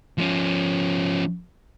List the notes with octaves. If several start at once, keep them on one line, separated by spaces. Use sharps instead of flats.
F3 C#4